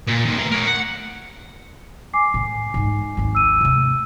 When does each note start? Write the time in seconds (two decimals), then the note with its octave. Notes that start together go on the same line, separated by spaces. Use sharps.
0.08 A#2
0.26 A#2 D#3
0.39 A3 A#5
0.51 A#4 C#5
0.67 F#5
2.13 G#5 D6 C7
2.34 A2
2.74 G#2 G#3
3.17 G#1 D#2
3.35 E6 D#7
3.61 C3 A3